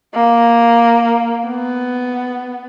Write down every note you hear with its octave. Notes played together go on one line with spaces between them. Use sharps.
A#3
B3